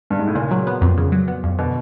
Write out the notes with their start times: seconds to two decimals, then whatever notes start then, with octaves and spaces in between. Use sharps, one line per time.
0.10 G2
0.19 G#2
0.27 A2
0.35 A#2 C#3
0.51 F#3
0.67 B3
0.81 F2
0.98 C#3
1.12 F#3
1.28 B3
1.44 F2
1.58 B2 D3